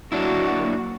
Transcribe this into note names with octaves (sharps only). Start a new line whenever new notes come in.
F#3 A#3 D4 E4 F#4